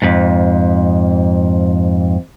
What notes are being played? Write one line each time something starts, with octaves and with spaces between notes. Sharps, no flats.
F2 G#2